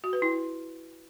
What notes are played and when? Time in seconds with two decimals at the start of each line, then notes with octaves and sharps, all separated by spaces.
0.04 F#4
0.13 B4
0.22 E4